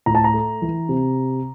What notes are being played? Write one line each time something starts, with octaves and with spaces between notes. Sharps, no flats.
A2 A#5
A5
A#5
A3
E3
C3